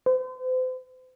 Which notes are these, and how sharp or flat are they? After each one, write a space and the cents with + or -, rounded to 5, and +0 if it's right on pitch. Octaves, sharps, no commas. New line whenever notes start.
C5 -40